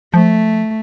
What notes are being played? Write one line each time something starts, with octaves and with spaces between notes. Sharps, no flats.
F3 A3